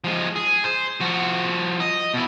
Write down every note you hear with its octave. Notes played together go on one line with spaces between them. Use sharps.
F3 G#3
G#4
C5
F3 F#4
D#5
B2 E4